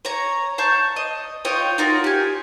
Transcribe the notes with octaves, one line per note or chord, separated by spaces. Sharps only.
C#5 A#5
F5 A5 C#6 G6
D#5
F4 C#5 D#5 G5
D#4 F4 F#4 A#4
G4 G#5